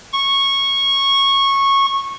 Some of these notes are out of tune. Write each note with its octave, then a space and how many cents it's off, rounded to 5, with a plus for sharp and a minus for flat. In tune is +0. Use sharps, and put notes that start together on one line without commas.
C#6 -15